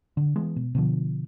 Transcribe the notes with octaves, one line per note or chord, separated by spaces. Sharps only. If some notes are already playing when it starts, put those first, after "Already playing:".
D3
E3 G#3 B3
B2
B2 D3 F3